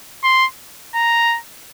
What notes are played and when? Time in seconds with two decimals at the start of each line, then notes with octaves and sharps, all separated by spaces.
0.24 C6
0.95 A#5